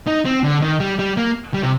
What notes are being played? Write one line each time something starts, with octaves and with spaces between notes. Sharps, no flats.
D#4
C4
D3
D#3
G3
G3
A#3
G3
C3